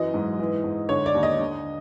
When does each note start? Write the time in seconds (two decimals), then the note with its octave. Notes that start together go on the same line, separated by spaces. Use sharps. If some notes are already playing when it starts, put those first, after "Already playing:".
Already playing: F#2 E3 D#5
0.14 G#2
0.39 E3
0.64 G#2
0.89 D3 C#5
1.06 D5
1.15 D#2
1.23 D#5
1.39 D3